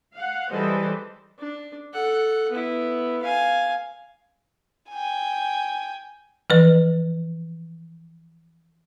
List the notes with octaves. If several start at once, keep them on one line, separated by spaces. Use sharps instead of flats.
F5 F#5
E3 G3 G#4 A4 C5 D#5
D4
A4 F#5
B3 E4
F5 G#5
G5 G#5
E3 F3 B4